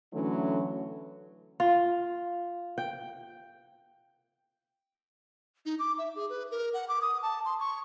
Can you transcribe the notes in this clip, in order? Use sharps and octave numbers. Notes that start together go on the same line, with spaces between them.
D3 E3 F#3 A3 C#4
F4
G5
D#4
D6
E5
G#4
B4
A#4
F#5
D6
D#6
A5
C6
C#6